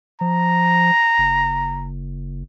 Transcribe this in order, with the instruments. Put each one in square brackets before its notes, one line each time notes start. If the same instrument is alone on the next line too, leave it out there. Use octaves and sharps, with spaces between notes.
[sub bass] F3 [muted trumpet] A#5
[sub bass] F#1